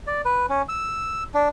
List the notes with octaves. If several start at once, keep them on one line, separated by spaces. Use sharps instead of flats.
D5
B4
C#4
E6
D4